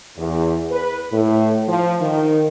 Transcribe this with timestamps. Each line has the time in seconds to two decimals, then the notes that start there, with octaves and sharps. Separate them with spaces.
0.17 E2
0.71 B4
1.12 A2
1.68 F3
2.01 D#3